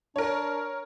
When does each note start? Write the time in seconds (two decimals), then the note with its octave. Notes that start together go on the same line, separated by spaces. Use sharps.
0.16 D4 A#4 C#5